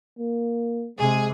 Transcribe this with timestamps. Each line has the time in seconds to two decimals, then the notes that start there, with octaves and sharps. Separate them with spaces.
0.19 A#3
0.99 C3 G#3 G#4 G#5